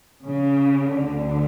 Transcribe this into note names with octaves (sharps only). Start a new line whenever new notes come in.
C#3
D2 D3